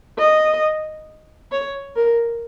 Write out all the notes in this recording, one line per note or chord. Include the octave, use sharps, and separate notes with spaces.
D#5
C#5
A#4